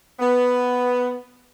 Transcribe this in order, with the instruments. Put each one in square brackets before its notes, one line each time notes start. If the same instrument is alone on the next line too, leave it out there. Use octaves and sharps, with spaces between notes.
[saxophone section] B3